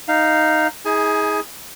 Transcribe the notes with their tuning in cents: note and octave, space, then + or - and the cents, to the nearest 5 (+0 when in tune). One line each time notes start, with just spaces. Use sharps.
D#4 +0 F5 +0
D#4 +45 G#4 +0 G#5 +25